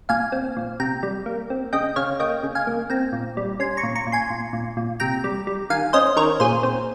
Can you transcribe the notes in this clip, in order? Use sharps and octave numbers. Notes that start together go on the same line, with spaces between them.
A#2 F5 G#5
C4
A#2
C3 G5 A#5
G3
A#3
C4
C#3 D#5 G5
C#3 C#5 F5
A#3 D#5 G5
C#3
F5 G#5
A#3
C4 G5 A#5
A#2
G3
C#4 G#5 C6
A#5 C#6
A#2
A#5 C#6
A#2
G#5 C6
A#2
A#2
A#2
C3 G5 A#5
G3
G3
D#3 F5 G#5
C#4 C5 D#5
D#3 A#4 C#5
A#2 G#4 C5
C4